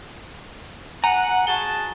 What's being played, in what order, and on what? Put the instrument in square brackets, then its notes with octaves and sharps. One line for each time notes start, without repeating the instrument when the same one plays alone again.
[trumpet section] F#5 [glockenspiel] G#5 [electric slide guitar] A#5
[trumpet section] F#4 G#4 A5 [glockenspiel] G7